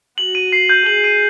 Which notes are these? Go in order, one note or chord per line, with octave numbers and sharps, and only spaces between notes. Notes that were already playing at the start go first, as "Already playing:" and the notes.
F#4 F#7
D#7
C7
G6
G#4 F#7
D#7